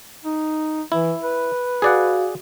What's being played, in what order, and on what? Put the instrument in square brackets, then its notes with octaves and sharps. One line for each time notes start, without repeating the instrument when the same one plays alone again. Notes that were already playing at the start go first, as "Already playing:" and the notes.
[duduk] D#4
[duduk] E3 [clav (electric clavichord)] E4
[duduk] B4
[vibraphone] F#4 F5 [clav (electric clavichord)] G#4 D5 F#5